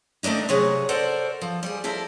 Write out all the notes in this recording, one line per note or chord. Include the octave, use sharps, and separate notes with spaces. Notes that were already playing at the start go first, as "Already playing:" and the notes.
D#3 A3 A#3 D4 D#4
C3 F#3 G#4 F#5
A4 A#4 C5 D5 F#5
F3
G3 G#4
F3 E4 A4 A#4